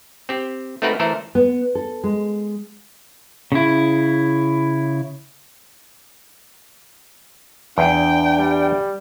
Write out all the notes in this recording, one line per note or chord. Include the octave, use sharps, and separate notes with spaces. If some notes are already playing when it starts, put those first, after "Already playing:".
C4 G4
A3 C4 D#4 F#4 A#4 B4
E3 A3 A4 A#4 C5
B3
A4
G#3
C#3 E4
E2 D4 G5
G3